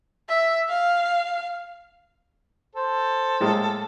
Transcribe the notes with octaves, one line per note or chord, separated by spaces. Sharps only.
E5
F5
A4 C5
A2 G#3 A#3